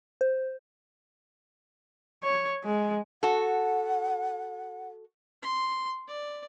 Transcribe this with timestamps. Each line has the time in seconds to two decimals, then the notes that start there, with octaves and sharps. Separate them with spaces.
0.21 C5
2.23 C#5
2.64 G#3
3.23 F#4 A4 F#5
5.42 C6
6.08 D5